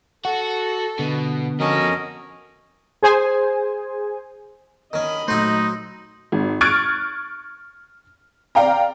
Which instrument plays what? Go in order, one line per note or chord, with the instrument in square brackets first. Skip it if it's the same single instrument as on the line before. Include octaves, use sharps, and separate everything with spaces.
[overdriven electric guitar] F#4 [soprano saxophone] A4 [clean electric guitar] F#5
[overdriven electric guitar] B2 [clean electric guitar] D3 B3
[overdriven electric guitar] F2 A4 [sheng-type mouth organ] C#4 A#4 D#5 [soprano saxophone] F#4
[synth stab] G#4 C5 G#5
[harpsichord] D#3 C#4 [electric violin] D#5 B5
[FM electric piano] A#2 A3 [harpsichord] F#3 F#4 C5 [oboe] D#4
[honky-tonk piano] G#1
C#6 F6 F#6 G#6 A6 D7
D5 F5 G5 A#5